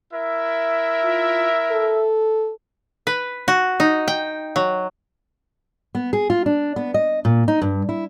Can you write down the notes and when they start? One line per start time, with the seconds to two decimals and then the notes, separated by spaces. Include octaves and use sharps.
0.12 E4 A#4 E5
1.04 F4
1.71 A4
3.07 B4
3.48 F#4
3.80 D#4
4.08 G5
4.56 F#3
5.95 B3
6.13 G#4
6.30 F4
6.46 D4
6.76 B3
6.94 D#5
7.25 A#2
7.48 D#4
7.61 G2
7.89 E4